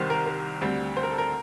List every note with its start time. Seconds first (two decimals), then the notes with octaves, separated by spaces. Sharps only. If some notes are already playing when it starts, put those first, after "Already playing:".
Already playing: C2 C3 D#3 C5
0.10 A#4
0.26 A#4
0.61 D2 D3 G3 C4
0.97 C5
1.03 A#4
1.11 A4
1.18 A#4